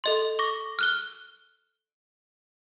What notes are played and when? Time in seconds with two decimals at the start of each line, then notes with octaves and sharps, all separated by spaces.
0.04 A4 D#5 C6
0.39 C#6 D6 A#6
0.79 F6 F#6 G7